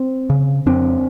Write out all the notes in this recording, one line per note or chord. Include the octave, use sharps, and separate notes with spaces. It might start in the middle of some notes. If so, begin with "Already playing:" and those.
Already playing: C4
C#3
F2 C4 D4